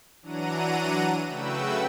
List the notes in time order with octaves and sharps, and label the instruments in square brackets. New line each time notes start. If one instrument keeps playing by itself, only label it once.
[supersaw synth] E3 F#3 D4 F#5 A#5 D#7
C#3 A3 F#4 B4 G5 E6